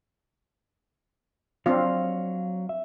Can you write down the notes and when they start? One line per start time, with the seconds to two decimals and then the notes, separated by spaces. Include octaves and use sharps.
1.66 F#3 C4 D4 F4 C#5 F5
2.69 E5